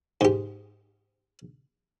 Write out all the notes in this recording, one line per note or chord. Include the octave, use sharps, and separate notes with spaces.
G#2 G4